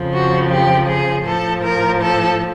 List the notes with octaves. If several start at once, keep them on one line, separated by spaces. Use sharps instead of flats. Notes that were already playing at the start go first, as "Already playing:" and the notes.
Already playing: F2 C#3 F3
F#4
G4
G#4
A2 F3 A4
A#4
A4